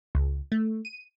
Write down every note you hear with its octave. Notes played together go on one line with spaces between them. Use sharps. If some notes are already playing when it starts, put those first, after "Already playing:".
C#2
A3
D#7